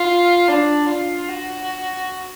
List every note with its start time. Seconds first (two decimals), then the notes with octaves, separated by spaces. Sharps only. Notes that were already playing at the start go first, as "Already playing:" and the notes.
Already playing: F4
0.48 D4
0.89 F4
1.29 F#4